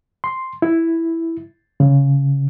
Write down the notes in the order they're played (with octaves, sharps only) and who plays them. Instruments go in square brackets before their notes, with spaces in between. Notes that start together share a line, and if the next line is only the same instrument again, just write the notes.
[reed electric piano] C6
E4
C#3